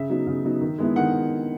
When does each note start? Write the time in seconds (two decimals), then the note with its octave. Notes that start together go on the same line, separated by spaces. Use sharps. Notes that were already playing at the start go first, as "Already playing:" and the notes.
Already playing: C#3 E5
0.09 F#3 B3 D#4
0.27 C#3
0.45 F#3 B3 D#4
0.61 D#3
0.78 G#3 B3 E4
0.96 D#3 F#5